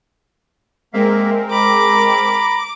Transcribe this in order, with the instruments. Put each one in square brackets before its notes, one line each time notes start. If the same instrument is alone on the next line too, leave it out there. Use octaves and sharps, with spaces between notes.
[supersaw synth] G#3 C4 A#4 [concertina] A#3 E5 F5
[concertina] A#5 B5 [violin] D6